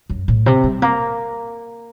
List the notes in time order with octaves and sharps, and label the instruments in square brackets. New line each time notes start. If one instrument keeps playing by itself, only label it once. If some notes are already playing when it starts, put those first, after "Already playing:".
[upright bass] F#2
A2
C3
G3
A#3